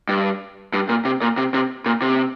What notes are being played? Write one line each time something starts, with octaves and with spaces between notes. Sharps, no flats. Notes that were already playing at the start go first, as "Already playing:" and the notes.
G2
G2
A#2
C3
A#2
C3
C3
A#2
C3